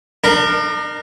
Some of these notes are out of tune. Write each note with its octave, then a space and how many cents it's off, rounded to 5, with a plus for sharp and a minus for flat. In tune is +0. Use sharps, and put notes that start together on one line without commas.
D4 +45 A#4 +0